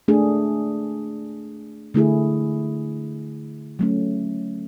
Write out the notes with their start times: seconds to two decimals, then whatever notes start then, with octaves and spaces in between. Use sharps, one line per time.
0.08 A3 D4 G#4
1.94 D3 A3 E4 G#4
3.79 F#3 A3 C#4